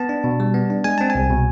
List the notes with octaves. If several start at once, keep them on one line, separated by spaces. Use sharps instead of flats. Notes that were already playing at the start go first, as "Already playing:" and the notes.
Already playing: B3 A5
D4
B2
G3
B3
D4
G#3 G#5
C4 A5
G#5
C2
B2